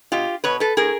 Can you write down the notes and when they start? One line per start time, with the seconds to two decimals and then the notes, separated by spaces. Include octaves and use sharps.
0.12 B2 F4 G4
0.44 B2 B4 C#5
0.60 A4 B4
0.77 A2 G#4 A#4